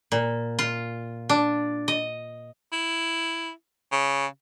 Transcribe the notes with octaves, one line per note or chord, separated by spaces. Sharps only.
A#2
F4
D4
D#5
E4
C#3